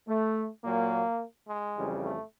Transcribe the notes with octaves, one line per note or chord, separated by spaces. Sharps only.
A3
A#2 F#3 A#3
G#3
F2 C#3 E3 G3
A3